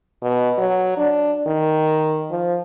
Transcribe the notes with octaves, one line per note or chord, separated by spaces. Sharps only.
B2
F#3
D4
D#3
F3